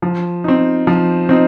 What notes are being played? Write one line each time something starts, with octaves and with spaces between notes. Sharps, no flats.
F3
C4 D#4
F3
C4 D#4